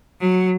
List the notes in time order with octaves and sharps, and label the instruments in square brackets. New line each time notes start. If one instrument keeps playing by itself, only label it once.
[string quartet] F#3